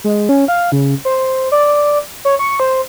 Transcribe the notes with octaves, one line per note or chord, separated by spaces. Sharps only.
G#3
C#4
F5
C#3
C5
D5
C#5
C#6
C5